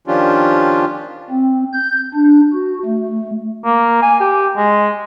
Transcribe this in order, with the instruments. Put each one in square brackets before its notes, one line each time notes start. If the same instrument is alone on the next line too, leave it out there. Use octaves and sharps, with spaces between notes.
[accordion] D#3 F3 C#4 D4 F4 G4
[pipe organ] C4
G6
D4
F#4
A3
[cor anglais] A#3
G#5
G4
G#3